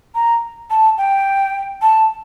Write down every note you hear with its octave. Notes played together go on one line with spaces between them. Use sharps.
A#5
A5
G5
A5